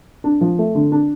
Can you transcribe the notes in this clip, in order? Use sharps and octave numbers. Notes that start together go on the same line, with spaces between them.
D4
F3
A3
D3
D4